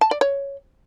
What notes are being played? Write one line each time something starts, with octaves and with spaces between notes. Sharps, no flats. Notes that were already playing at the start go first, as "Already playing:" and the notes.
A5
D5
C#5